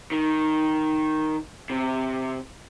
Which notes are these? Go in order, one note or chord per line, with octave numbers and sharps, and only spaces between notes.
D#3
C3